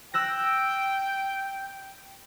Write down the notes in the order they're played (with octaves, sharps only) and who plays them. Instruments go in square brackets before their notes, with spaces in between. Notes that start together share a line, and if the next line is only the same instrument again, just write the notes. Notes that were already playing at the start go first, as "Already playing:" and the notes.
[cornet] G5 [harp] E6 F#6 A#6